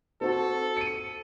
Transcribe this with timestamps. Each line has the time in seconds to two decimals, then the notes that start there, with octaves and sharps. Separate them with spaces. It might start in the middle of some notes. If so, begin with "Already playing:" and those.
0.21 C4 F#4 A4
0.77 C#7 D#7